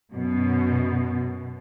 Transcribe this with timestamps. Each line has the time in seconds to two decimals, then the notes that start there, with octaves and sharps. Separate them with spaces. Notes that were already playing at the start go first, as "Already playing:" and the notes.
0.12 F#2 B2